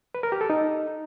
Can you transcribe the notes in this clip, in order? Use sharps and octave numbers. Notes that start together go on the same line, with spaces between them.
B4
A#4
G4
A4
D#4